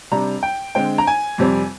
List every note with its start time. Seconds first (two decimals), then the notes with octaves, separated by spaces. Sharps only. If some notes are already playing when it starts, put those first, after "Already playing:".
0.12 C3 G3 D4 A#5
0.43 G5
0.75 D3 G#3 C4 G5
0.98 A#5
1.07 G#5
1.38 F2 C3 G3 C4